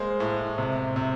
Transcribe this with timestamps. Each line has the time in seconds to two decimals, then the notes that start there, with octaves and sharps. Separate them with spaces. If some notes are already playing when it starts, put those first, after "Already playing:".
Already playing: G#3 A#3 C5
0.20 A2
0.58 C3
0.96 C3